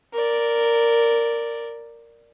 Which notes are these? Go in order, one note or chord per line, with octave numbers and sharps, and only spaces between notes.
A#4 D5